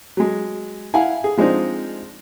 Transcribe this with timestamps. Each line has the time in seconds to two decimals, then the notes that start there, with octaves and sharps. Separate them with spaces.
0.17 F#3 G#3
0.94 E4 F5 F#5 G#5
1.24 G#4
1.37 F3 G#3 C4 D4 D#4